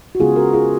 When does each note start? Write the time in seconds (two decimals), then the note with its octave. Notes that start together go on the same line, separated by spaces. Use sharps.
0.15 F#4
0.20 C#3 G#3 B3 F4 G#4
0.36 F#4 A#4
0.54 F4 G#4